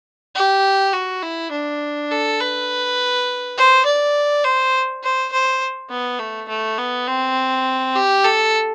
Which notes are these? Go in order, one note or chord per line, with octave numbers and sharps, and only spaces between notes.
G4
F#4
E4
D4
A4
B4
C5
D5
C5
C5
C5
B3
A3
A3
B3
C4
G4
A4